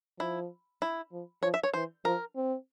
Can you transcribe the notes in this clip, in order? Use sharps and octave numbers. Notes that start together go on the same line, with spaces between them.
F3 E4
E4
F3
F3 C#5
E5
C#5
E3 C5
F3 A#4
C4